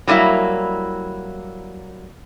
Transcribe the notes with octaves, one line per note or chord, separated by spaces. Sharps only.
F#3 G3 A#3 E4